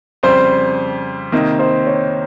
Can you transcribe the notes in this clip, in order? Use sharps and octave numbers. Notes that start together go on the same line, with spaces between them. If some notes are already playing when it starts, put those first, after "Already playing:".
F2 C#3 G3 C5
C3 D#3 A#3 D#4
C5
C#5